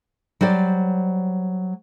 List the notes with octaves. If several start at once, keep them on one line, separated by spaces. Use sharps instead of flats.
F#3 G3 C5 D5